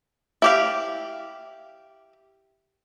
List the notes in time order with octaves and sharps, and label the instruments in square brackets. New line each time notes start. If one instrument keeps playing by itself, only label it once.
[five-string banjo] E4 G4 F5